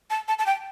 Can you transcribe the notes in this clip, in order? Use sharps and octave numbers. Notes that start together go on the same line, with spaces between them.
A5
A5
A5
G5